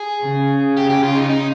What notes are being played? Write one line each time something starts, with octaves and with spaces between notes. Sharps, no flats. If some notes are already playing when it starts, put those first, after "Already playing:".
Already playing: G#4
C#3
G4
G4
F4
D#4
D#4